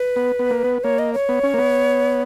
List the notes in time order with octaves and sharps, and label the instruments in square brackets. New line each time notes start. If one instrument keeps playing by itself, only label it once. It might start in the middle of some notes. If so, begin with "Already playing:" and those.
Already playing: [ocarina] B4
[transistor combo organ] B3
B3
A#3
B3
[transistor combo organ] A#3 [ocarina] C#5
[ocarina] D#5
C#5
[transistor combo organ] B3
C#4
A#3
B3